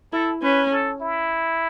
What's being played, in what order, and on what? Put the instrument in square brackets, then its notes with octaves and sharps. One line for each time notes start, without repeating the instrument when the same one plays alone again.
[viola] E4 [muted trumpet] A4
[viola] C#4 [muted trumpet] B4
[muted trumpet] A4
E4